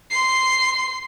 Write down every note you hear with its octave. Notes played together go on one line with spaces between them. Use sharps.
C6 C7